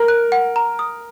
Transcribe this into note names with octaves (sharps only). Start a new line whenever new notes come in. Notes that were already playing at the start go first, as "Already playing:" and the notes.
Already playing: A#4
F#6
F#5
A#5
D#6